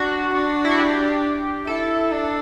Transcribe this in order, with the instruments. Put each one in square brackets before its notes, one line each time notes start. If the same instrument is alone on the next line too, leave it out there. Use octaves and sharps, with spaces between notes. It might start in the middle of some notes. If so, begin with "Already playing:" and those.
Already playing: [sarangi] D4 [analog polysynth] F#4
[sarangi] D4
[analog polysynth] E4
F#4
G4
[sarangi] E4 [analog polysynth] A4
[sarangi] D4